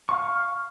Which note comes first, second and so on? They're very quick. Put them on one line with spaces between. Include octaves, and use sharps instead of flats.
C#6 F5 F6